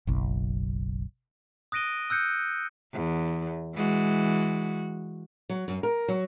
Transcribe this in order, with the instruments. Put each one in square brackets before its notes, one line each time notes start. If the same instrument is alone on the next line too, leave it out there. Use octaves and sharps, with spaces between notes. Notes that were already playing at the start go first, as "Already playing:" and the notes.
[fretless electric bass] F#1 B1
[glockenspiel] D#6 F#6 A#6 D7 D#7 G7
E6 F#6 G6 C#7
[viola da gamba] E2
E3 G#3 F#4
[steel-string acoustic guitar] F#3
F#2
A#4
F#3